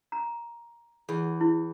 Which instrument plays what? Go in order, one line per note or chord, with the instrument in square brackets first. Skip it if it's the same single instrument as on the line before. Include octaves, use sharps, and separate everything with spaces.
[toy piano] A#5
[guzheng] E2
[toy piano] E4